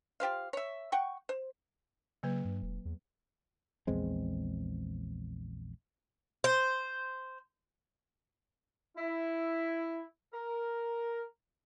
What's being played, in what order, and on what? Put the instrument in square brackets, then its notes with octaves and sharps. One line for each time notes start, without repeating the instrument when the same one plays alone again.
[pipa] F4 G4 C5 F5
C#5 E5
F#5 G5 C#6
C5
[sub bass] C#3 [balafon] F#3 A#3 B4
[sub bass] G2
E1
E2
[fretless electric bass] A#1 E2 G#3 C4
[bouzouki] C5
[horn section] E4
A#4